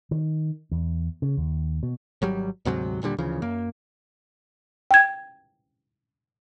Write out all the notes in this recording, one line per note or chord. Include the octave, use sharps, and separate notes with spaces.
D#3
E2
C#3
D#2
B2
G#1 F#3 G3
D2 G#2 C3 F#3
D#1 A#2 D3 G3
D2 C#3 E3 F3
F#2 A#3
G5 G#6